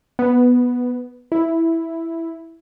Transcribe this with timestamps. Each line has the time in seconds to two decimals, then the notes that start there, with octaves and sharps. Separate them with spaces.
0.19 B3
1.32 E4